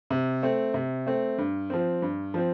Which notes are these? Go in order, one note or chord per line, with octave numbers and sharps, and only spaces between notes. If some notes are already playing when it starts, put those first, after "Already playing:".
C3
A3 C4
C3
A3 C4
G2
F3 C4
G2
F3 C4